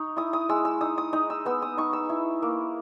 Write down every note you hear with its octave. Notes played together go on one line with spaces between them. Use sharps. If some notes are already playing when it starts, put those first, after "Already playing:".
Already playing: D#4 C#6
E4 D#6
D#6
G#3 E6
E6
D#4 D#6
D#6
D#4 D#6
E6
B3 E6
D#6
D#4 C#6
E6
E4
A#3